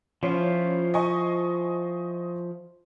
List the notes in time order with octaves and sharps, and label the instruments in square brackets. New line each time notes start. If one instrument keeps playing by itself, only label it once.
[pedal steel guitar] F3 E4 F4 [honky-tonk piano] C#4
[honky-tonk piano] D#5 G#5 C#6